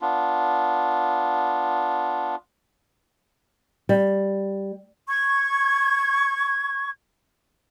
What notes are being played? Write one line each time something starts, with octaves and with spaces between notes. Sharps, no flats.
B3 D4 F4
G3
C#6 G#6